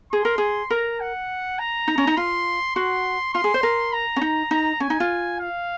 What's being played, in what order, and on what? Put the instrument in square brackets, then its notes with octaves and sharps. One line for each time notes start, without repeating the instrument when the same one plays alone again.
[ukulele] G#4 [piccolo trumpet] C6
[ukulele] A#4
G#4
[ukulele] A#4 [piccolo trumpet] A#5
[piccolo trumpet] F#5
A#5
[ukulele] D#4
C#4
D#4
[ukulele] F4 [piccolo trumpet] C6
[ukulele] F#4 [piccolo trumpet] C6
[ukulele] F4 [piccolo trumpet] C6
[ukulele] G#4
C5
A#4
[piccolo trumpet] A#5
[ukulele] C#4
D#4
[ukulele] D#4 [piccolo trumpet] A#5
[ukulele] C#4 [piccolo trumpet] G#5
[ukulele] D#4
F4
[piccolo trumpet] F5